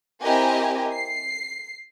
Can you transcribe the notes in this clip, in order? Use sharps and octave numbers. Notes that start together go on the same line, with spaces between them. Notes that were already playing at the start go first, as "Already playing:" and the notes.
C4 E4 G4 A#4 D#5 G#5
C7